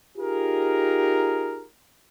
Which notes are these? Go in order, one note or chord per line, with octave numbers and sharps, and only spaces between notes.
D#4 F4 G4 G#4 A#4